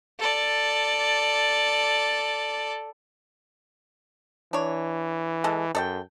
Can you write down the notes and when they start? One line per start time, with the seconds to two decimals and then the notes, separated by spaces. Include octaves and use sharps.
0.19 A4 D5
4.53 E3 D4 C#5
5.44 G#3 A4
5.75 F#2 A4 D#5 G5